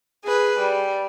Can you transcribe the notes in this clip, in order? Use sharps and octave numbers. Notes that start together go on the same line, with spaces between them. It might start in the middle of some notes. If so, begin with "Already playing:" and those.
G#4 B4
G3